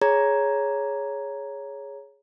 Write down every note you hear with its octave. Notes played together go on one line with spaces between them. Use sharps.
G#4 C#5 A#5 G#6